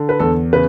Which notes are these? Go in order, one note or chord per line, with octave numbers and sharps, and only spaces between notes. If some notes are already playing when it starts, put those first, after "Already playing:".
Already playing: D3
B4
E2 A4
C#3 B4